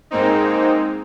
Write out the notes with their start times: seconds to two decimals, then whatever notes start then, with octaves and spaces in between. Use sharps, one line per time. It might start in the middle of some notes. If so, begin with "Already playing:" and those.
0.11 G#2 G#3 A#3 C4 D#4